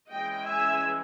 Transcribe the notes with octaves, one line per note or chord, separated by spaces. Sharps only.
E3 G#3 C#4 D#5 G5
E5 G#5